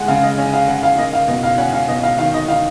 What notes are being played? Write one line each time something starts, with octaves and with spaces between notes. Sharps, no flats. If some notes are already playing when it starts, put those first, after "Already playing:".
Already playing: G#3 F#5
C#3 F5
D#5
C#4
F5
C#3 F#5
F5
A#3 D#5
F5
B2 D#5
F5
C#4 F#5
F5
B2 D#5
F5
D#3 F5
D#5
D#4 F5